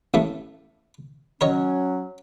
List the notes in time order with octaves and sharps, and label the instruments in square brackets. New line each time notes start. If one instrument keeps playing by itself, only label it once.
[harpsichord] A1 A2 A3
[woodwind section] F#3 C#4 [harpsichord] A#4 C#5 D#5